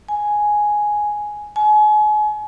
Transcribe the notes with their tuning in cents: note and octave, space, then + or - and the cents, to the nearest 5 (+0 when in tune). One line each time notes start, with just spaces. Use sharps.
G#5 +5
G#5 +35